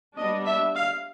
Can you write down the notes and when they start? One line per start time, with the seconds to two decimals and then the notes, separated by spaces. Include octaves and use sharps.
0.17 G3 B3 D4 D#5
0.46 E5
0.76 F5